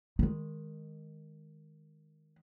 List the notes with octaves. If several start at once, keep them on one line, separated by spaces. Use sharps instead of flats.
D#3 G#3